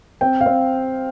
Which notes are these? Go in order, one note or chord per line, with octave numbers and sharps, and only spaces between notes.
C4 G5
F5
C4